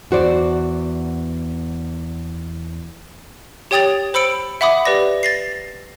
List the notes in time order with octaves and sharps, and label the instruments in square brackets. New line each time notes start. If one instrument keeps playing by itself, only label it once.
[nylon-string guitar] E2 F#4 C5 D5
[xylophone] G4 C#5 G5 D#6 A6 F7
C5 B5 E6 C#7 D7
E5 F#5 B5 D6 D#6
G4 B4 D5 A#6
A6 A#6 C7